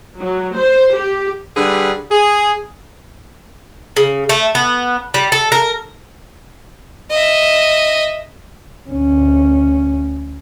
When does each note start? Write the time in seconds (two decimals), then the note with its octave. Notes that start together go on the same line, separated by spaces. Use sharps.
0.19 F#3
0.56 C5
0.97 G4
1.57 D3 G3 G#4 B4
2.11 G#4
3.97 C#3
4.29 A3
4.55 B3
5.14 G3
5.32 A4
5.52 A#4
7.10 D#5 E5
8.90 D2 C#4